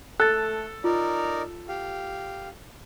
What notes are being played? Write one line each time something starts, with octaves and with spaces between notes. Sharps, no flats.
A3 A4 F#6 A6
D#4 F4 A#4 D5
G4 F5